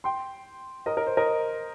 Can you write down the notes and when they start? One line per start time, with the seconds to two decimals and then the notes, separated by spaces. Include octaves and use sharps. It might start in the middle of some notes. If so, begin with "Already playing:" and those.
0.04 G5 C6
0.86 A#4 D#5
0.97 A#4
1.07 C5
1.17 A#4 D#5